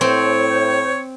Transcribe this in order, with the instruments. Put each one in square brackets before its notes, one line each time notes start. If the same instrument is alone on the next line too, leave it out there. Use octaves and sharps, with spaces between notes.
[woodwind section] A2 [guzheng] C4 [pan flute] C5 [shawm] C#5